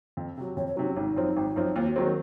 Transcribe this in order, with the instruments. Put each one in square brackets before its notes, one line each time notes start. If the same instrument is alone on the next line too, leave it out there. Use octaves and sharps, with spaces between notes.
[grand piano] F2
C3 F#3
[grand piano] F2 [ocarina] C#5
[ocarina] C#5
[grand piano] C3 F#3 [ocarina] D#4
[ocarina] C#4
[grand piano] G#1 [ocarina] D#4
[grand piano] F#2 F3 C4
G#1
F#2 F3 C4
[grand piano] D#2 [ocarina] F4
[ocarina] F#4
[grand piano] D#3 F#3 C4 [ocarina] G#4
[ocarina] A#4